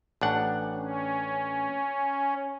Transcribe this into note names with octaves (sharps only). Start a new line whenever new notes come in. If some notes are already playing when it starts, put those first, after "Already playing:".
A1 D4 F#5
C#4